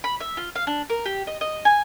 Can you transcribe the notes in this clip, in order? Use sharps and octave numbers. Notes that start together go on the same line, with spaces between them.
B5
E5
F4
F5
D4
A#4
G4
D#5
D#5
G#5